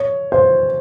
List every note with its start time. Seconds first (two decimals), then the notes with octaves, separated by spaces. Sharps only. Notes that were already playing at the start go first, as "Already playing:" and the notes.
Already playing: C#5
0.32 C5